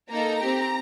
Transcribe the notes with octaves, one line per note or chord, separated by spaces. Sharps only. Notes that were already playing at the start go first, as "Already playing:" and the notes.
A#3 D#4 A4 A#5
C4 G4